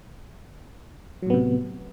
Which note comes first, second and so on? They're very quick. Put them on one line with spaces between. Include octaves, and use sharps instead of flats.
F#3 A2 B3 C3